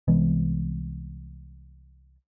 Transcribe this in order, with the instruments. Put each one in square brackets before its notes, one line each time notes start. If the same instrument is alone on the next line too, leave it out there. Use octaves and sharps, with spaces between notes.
[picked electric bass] C2 E3 G#3 B3